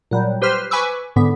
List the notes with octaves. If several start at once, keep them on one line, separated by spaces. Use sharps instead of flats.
A#2 F#3 G3
G4 B4 C5 C6 F6
B4 G#5 B5 C#6 D6 E6
G#2 D3 B3